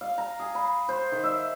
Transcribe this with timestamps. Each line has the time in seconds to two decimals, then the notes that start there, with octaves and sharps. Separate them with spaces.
0.01 F5
0.18 A#5
0.39 G#4
0.55 B5
0.89 C5
1.12 D#3
1.24 E5